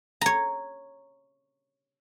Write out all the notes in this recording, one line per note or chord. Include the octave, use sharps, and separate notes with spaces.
C#5 A#5